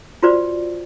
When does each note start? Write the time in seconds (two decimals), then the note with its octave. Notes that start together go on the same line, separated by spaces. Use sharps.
0.23 F4 F#4 B4 C5 D5